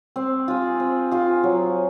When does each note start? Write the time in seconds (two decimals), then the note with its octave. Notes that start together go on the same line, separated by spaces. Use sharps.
0.16 C4
0.48 F4 G#4
0.80 C4
1.11 F4 G#4
1.44 F#3